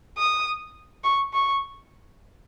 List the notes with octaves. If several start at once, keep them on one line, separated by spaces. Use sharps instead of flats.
D#6
C#6
C#6